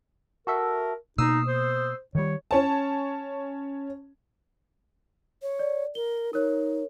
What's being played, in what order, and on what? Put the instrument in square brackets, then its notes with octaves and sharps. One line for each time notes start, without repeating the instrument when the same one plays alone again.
[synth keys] F#4 A4 E5 [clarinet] A#4
[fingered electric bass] B2 A#3 [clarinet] D#4 [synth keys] D#6 E6 C7
[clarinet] C5
[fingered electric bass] D#3 G3 [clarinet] C#5
[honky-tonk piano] C#4 C#5 A5
[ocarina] C#5
[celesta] D5
[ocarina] A#4 [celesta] G7
[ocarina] D#4 [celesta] A#4 C#5